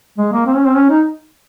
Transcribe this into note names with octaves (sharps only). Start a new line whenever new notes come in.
G#3
A#3
C4
C#4
C4
C#4
D#4